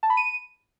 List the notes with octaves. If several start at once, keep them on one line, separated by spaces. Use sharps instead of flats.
A5
B5
D#7